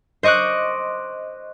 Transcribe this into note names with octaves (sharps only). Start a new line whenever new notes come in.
C5 D#5 C#6 D6 F#6